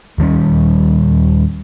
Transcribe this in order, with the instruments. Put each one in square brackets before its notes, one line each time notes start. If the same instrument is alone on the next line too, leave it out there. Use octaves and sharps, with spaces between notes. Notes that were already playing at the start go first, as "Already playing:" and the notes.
[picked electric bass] D#1 D#3 G3 C#4